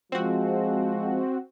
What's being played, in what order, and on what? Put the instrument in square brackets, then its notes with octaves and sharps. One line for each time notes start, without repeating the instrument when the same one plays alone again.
[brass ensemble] F3 G#3 [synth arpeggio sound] C4 F#4